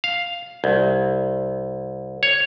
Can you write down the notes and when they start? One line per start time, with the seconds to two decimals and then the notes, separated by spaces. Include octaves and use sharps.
0.04 F5
0.64 C2
2.23 C#5